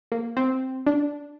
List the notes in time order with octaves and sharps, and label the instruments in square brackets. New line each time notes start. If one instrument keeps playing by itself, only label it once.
[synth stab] A#3
C4
D4